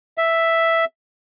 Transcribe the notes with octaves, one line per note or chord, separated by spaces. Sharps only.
E5